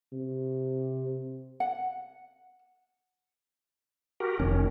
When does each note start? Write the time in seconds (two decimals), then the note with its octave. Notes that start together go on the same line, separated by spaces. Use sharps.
0.13 C3
1.60 F#5
4.20 F#4 G4 A#4
4.39 F1 D#3 C#4